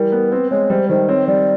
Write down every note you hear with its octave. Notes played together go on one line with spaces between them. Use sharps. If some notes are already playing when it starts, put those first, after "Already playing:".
Already playing: E3 G3 A#4
B3
C4 B4
G#3 C#5
G3 C5
D#3 C5
C4 C#5
G3 D5